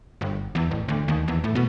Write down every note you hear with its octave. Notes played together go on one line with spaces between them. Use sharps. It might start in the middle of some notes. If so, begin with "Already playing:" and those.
G1
E2
A1
D2
D#2
E2
A2
B2